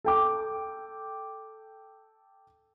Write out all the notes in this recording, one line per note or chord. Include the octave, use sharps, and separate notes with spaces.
A4 G5 D6